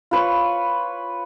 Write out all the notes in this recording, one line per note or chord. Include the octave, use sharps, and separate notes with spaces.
F4 B4 C#5